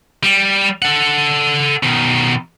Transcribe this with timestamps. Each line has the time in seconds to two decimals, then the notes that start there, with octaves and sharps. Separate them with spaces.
0.23 G3
0.82 A4 F#5
1.83 B2 D#3